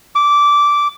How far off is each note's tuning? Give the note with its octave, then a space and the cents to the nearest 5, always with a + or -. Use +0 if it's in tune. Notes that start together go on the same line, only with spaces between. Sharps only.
D6 -10